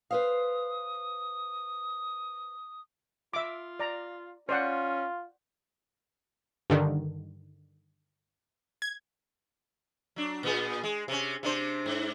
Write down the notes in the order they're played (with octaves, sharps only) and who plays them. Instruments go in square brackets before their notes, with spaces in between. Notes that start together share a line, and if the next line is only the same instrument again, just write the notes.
[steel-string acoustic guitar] B4 C5 F5 [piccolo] D#6
[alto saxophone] F4 [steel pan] E5 D6
[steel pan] D5 A#5
[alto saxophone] C#4 [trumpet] F4 [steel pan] C5 D5 F#5
[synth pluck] G2 D3 D#3
G#6
[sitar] F#3 D4
A#2 B3 G#4
G#3
C3 C#4
C3 D4 C5
G#2